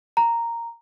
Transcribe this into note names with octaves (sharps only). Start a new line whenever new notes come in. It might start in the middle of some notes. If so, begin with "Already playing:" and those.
A#5